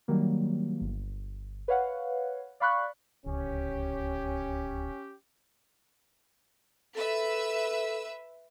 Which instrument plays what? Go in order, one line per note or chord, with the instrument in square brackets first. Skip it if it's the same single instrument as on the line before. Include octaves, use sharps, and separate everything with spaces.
[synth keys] D#3 F#3 G3 A#3
G1
B4 C#5 F5 F#5
D5 F5 B5 C#6 F#6
[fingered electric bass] D1 C#2 [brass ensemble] C#4 G4
[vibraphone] A4 [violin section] B4 E5 E6